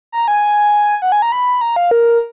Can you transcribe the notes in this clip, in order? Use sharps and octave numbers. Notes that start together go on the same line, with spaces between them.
A#5
G#5
F#5
G#5
A#5
B5
A#5
F5
A#4